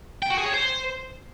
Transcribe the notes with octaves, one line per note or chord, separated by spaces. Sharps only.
G5
F#4
G#4
C#5
C5